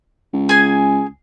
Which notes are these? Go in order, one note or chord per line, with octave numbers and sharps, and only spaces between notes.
C#2
G#4 G#5